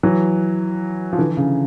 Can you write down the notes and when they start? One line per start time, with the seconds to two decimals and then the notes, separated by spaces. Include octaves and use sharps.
0.03 E3 F#3
1.13 F3
1.18 D3 E3
1.37 C#3